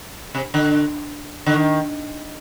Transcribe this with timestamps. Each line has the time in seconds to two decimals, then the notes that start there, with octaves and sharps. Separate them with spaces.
0.35 C3
0.54 D3
1.46 D3
1.54 D#3